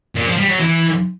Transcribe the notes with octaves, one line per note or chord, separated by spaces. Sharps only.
A#2
F3
G3
F#3
E3